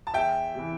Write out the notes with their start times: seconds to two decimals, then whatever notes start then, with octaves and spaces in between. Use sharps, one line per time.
0.07 A5
0.14 E2 E5 G5
0.55 C3 E3